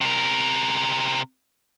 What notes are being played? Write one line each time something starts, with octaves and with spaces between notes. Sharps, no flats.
C3 A#4